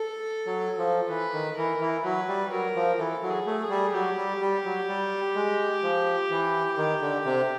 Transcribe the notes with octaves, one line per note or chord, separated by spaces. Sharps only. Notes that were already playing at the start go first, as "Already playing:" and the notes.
Already playing: A4
F#3
F3
E3 B4
D#3
E3 A#4
E3
F#3 B4
G3
F#3 A#4
F3
E3 A4
F#3
G#4
A3
G#4
G3
F#3 G4
G3
G3
F#3
G3
G#3
F3
E3
D#3
D3
C3